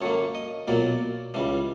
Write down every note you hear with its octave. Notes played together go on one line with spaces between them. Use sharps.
F#2 D3 F#3 A#3 C#5
D#5
B1 A#2 F#3 A#3 D5
C#2 C#3 E3 G3